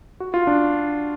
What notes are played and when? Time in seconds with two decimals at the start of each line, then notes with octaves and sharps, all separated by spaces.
0.20 F#4
0.34 F4
0.47 D4